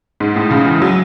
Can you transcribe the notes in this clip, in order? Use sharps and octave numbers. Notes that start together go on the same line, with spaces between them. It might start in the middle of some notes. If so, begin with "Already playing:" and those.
G#2
A2
C#3
E3
F#3